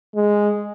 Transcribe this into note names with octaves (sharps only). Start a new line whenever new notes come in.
G#3